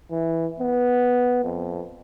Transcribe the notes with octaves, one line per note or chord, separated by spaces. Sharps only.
E3
B3
F2